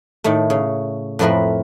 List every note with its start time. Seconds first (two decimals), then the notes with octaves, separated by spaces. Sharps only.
0.24 A2 D#3 A3
0.50 C#3
1.19 F2 A2 C4 E4 A#4 B4